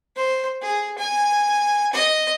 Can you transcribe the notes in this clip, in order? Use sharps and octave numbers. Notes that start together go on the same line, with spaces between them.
C5
G#4
G#5
D#5